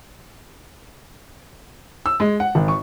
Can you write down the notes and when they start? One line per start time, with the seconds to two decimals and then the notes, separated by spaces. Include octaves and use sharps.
2.06 E6
2.20 G#3
2.40 F#5
2.55 G#1
2.68 C#6